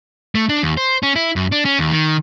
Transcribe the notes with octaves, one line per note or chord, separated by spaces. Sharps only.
A3
D4
D#2
C5
C#4
E4
F#2
D4
C#4
D#2
D#3